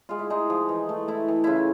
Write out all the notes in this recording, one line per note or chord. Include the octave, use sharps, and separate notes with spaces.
G#3 F4
E4
G#3 D#4
F3
E3
A3
A3 E4
E3
C#3 E4 F4